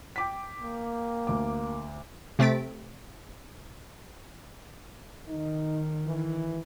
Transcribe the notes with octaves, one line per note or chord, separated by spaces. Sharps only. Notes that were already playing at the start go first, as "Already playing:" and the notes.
G5 D6 B6
A#3
D2 D6
C3 A3 C4 A6 B6 D7
D#3 D#4
E3